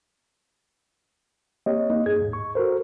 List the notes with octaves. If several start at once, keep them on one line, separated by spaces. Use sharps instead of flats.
A#3 C4 G4 C#5 D#5
A#3 D#4 D#5
G2 G#4 G#6
D#2 G#2
C#6
F#4 A4 A#4 C5